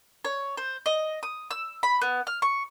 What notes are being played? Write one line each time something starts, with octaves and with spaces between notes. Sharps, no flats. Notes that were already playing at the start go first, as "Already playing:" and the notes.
C#5
C5
D#5
D#6
E6
B5
B3
F6
C#6